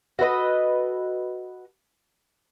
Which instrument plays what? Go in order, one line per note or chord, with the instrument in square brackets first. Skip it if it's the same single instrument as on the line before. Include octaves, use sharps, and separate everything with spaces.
[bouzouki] F#4 A4 B4 D#5